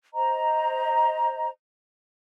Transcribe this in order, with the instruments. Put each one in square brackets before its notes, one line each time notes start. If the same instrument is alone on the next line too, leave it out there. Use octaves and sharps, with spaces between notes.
[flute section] C5 D#5 A#5